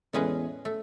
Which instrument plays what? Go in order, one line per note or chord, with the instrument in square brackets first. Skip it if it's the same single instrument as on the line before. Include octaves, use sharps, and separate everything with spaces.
[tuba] E2 [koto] A2 G#3 C#4 G#4 B4
[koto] A3